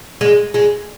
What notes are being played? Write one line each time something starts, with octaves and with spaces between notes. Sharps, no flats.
G#3
G#3